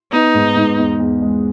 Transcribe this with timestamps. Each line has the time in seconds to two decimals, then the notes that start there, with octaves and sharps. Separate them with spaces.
0.12 B3 D#4
0.34 G#2
0.56 G#2
0.78 E2
1.00 E2
1.22 G#3